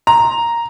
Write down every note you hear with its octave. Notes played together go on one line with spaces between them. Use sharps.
A#5